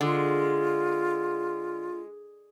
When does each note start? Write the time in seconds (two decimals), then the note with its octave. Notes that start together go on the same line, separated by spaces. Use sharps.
0.01 D3 G#3 F4